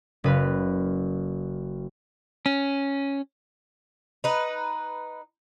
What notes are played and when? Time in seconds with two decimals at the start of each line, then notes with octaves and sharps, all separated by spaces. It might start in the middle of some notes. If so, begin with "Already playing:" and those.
0.24 F#1 B4 F6
2.46 C#4
4.24 D#4 B4